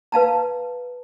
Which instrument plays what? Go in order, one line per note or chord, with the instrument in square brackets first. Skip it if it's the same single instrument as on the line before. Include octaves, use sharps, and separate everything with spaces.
[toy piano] B4 F5 A5 A#5